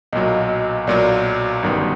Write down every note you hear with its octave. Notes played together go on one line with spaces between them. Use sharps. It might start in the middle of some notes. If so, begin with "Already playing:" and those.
B1 A#2 F#3 D#5
B1 A#2 F#3 D5
G1 F#2 D#3 G3 B3